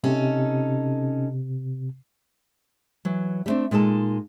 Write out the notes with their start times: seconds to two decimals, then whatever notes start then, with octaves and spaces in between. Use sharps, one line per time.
0.04 C3 C#4 D#4 A4
3.05 E3 F#3
3.46 G3 A3 C4 D4
3.71 A#2 G#3 D#4 A4 A5